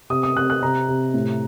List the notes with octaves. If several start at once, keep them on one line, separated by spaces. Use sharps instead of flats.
C3 D#6
D#6
C3 F#6
F#6
C3 A#5
C3
A2